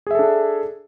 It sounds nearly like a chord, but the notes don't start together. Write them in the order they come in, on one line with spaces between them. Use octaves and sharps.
G#4 E5 A4 D4